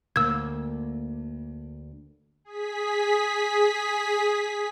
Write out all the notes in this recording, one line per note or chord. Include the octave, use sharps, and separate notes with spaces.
D2 A#3 E6 G#6
G#4 B6